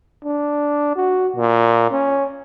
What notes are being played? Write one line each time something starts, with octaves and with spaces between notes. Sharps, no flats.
D4
F#4
A#2
C#4